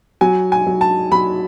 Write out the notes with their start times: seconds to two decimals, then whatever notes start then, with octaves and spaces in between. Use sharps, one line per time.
0.21 F#3 G#5
0.52 G#5
0.67 F#3
0.81 A5
1.12 F#3 B5